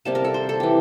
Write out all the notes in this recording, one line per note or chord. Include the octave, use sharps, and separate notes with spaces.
C3 G3 A#3 A5
A#4
A4
C5
A4
E3 G4